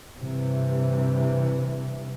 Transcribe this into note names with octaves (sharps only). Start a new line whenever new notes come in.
G2 C3 E3